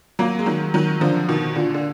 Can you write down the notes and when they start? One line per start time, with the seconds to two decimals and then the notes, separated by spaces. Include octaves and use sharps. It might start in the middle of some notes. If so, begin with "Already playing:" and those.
0.19 F#3 A#3
0.39 G#3
0.46 D#3 F#3
0.74 D#3 F#3
1.01 D3 F3
1.29 B2 D#3
1.56 A#2 D3
1.74 D3